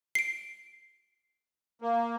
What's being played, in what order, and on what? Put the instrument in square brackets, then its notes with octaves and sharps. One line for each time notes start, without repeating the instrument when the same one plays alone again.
[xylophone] C7 D7
[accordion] A#3